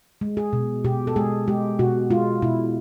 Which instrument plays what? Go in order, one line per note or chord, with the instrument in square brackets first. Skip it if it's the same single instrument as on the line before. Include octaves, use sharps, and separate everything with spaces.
[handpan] G#3
G#4
B2
B2 G4
A4
G#3 G#4
G#3 G4
B2 F#4
G#3 F4
B2 E4